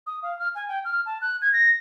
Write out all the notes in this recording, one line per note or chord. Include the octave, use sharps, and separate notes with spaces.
D#6
F5
F6
G#5
G5
F6
A5
F#6
G#6
A#6